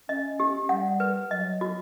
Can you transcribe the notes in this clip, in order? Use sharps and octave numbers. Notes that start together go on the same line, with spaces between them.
C#4 D#5
G4
G3 F#5
B4
F#3 D#5
F#4